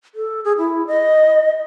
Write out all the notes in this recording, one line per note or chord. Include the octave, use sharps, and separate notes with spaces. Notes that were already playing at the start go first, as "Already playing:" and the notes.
A4
G#4
E4
D#5